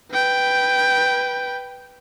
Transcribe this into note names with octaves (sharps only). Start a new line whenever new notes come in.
B4 G5